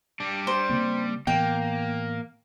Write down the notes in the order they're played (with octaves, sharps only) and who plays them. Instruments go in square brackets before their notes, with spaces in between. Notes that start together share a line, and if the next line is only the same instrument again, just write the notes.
[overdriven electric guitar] G3 D4
[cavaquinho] C5
[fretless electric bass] C#3 A#3 C4
[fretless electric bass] A2 E3 B3 [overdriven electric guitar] A#3 [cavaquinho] G5